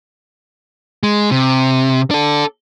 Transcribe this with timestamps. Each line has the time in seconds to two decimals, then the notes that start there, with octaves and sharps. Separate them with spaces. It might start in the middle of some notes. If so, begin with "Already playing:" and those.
1.03 G#3
1.32 C3
2.11 D4 A4